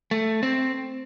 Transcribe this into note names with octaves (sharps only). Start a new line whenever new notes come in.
A3
C4